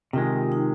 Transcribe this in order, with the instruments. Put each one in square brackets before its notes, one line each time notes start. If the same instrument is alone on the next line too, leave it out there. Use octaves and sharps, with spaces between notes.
[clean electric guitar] C3 D#3 G#3 [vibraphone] F4
[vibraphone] D#4